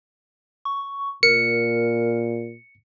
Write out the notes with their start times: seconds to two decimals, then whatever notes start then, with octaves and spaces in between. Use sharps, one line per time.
0.65 C#6
1.23 A#2 A#4 C#7